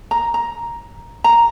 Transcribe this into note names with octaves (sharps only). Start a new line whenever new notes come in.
A#5
A#5
A#5